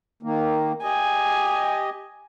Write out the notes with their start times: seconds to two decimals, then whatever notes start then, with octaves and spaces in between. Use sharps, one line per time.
0.23 D#3 A#3
0.83 G4 D#5 G#5